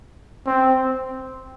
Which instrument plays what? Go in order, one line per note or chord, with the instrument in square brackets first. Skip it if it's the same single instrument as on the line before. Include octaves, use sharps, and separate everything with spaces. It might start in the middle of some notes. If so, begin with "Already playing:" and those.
[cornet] C4